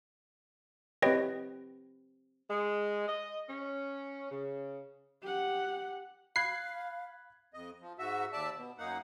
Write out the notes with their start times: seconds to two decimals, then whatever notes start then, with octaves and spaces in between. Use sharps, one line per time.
1.02 C4 G4 B4 C#5 D#5 G5
2.50 G#3
3.08 D#5
3.49 C#4
4.31 C#3
5.23 G4 F#5
6.36 F5 B5 F#6 G#6 C7
7.54 F2 D#5
7.81 F3
7.99 G#2 F#4 E5
8.32 D#2 D5 E5 A5
8.55 B2
8.78 F#2 A#3 D#4 F#5